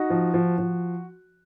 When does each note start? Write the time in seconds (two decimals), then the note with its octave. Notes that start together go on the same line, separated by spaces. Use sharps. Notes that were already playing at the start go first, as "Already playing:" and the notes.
Already playing: D#4 F#4
0.10 F3
0.34 F3
0.58 F3